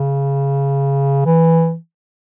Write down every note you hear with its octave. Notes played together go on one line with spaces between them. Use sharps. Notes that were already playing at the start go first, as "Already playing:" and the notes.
Already playing: C#3
E3